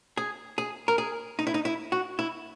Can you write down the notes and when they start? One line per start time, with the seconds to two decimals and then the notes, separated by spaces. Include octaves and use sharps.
0.17 G#4
0.58 G#4
0.88 A#4
0.98 G#4
1.39 D#4
1.47 E4
1.54 D#4
1.65 E4
1.92 F#4
2.19 E4